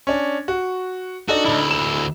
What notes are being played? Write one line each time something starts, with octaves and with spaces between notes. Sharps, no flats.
C#4 D4
F#4
D4 D#4 F#4 A4
D2 E4
E7